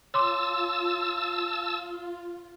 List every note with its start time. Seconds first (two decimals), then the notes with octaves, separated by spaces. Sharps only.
0.14 F4 C#5 A5 C6 D6 E6